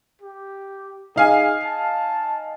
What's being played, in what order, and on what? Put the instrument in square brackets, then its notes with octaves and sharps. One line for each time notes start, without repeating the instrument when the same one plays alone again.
[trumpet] G4
[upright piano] D#4 F5 G#5 [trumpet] G#4
[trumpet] A5